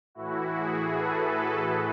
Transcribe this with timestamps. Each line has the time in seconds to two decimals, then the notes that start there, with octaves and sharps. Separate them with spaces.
0.15 A2 E3 E4 F#4
0.52 F#4 G#4
0.91 A4 B4